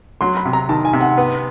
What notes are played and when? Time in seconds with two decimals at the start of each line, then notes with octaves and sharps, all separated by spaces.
0.21 F#3 C6
0.37 B5
0.45 C3
0.53 A#5
0.69 D#3 A5
0.85 G#5
0.93 C3
1.01 F#5
1.18 B3